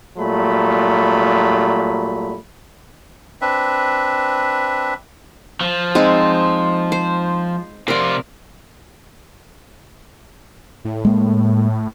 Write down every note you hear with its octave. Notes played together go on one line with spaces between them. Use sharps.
A#2 F#3 G3 A3 B5
C4 D4 B4 E5
F3
G#3 C4 D#4
C5
C3 F4 A#4 D5
A2
G#3 A#3